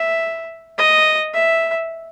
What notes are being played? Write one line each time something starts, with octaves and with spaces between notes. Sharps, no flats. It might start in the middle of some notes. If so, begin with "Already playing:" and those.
Already playing: E5
D#5
E5